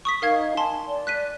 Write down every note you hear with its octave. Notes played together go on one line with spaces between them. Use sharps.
C#6 D#6 B6
D#4 A#4 F5 G#6
G#5 A5 C6
D5
F#6 B6 D#7